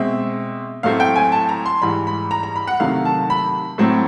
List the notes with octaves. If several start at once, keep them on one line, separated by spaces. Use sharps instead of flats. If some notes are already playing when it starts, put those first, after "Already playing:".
Already playing: B2 G#3 C4 E5
A2 F#3 A3 C4 F5
G5
G#5
A5
A#5
C6
G#2 E3 G3 B5
B5
A#5
A#5
B5
F#5
C3 D#3 F#3 A3 F5
A5
B5
A2 F#3 A3 C4